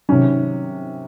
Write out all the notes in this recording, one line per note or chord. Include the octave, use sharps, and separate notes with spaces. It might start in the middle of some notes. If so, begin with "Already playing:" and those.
C3 D#3 F#3 C#4